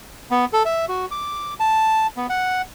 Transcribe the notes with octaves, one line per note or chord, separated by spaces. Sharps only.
B3
A4
E5
F#4
D6
A5
B3
F#5